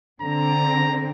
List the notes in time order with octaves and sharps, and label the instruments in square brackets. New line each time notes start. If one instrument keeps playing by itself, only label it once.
[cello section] D3 C4 [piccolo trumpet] A#5